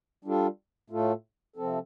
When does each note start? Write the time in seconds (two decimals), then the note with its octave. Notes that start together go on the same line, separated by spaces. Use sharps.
0.25 G3 D4 F4 A4
0.90 A2 A3 F4 A4
1.56 C3 F3 C4 A4